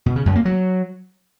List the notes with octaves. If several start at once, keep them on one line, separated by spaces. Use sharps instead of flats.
B2
C#3
F#2
A#3
F#3